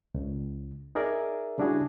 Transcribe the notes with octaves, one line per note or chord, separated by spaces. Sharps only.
C#2
D#4 G#4 A#4 D5 E5
C#3 G3 D4 E4 F#4 G#4